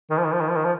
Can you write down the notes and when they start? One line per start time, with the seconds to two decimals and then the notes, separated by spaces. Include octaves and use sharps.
0.11 D#3
0.18 F3
0.25 D#3
0.33 F3
0.40 D#3
0.49 F3
0.56 D#3
0.65 F3